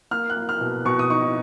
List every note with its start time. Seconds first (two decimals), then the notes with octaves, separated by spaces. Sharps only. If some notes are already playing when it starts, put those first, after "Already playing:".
0.11 A#3 F6
0.30 F#6
0.36 A#3
0.49 F6
0.61 B2
0.85 B2 C#6
0.99 D#6
1.10 D#4 C#6